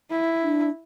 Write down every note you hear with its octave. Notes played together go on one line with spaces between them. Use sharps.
E4
D4